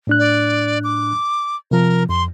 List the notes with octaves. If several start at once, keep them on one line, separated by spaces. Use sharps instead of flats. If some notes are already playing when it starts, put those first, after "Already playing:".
A2 D4 F#6
D5
D6
C3 F3 A#4
F2 C6